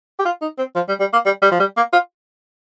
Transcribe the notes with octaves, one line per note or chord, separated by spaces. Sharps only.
G4
F4
D#4
C4
F3
G3
G3
A#3
G3
G3
F3
G3
A#3
F4